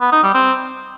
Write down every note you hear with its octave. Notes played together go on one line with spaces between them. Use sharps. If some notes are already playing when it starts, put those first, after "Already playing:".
B3
D#4
G3
C4